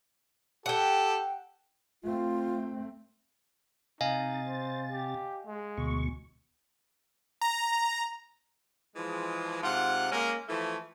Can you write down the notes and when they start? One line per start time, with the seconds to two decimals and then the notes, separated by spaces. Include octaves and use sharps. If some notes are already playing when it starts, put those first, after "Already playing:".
0.66 G4 A4 F#5 G5
2.03 A3 C4 F4
4.01 C3 D#4 D#5 F5 G#5 A6
4.45 C5
4.91 G4
5.46 G#3
5.78 D2 B2 C#6
7.41 A#5
8.96 E3 F3 G#3
9.63 G#2 C3 F4 F#5
10.12 G#3 A#3 C#4 A#4
10.49 E3 F3 A3